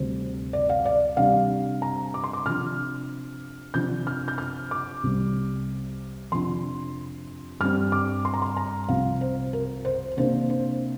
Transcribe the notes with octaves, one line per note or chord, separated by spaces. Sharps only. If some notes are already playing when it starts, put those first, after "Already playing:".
Already playing: D2 C3 G3 C4 C5
D5
F5
D5
C3 G3 D4 F5
A#5
D6
C6
D6
C3 F3 D4 F6
C3 F3 D4 G6
F6
G6
F6
D6
C2 C3 G3
F2 C3 F3 D4 C6
G2 G3 C4 F6
D6
C6
A#5
C6
A#5
C2 C3 F3 C4 F5
C5
A#4
C5
C3 A#3 D4 C5
C5